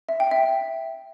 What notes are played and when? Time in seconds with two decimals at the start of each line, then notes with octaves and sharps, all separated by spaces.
0.09 E5
0.20 G5
0.31 E5